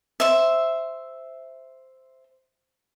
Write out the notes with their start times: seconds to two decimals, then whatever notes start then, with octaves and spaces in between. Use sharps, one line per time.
0.20 C5 E5